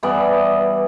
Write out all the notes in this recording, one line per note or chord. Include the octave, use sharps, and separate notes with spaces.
G2 E3 B3 D5